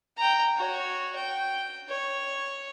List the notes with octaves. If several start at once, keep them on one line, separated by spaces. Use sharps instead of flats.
G5 A#5
F#4 C#5
G5
C#5